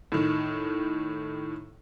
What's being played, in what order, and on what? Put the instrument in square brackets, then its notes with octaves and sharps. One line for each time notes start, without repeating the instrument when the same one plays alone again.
[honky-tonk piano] A2 D#3